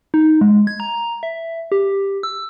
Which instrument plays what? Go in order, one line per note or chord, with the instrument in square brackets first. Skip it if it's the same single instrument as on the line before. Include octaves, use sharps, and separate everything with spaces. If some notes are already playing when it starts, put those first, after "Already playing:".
[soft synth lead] D#4
G#3
G#6
A#5
E5
G4
E6